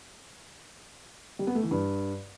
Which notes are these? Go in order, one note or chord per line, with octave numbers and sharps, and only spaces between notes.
G3
B3
A3
E3
G2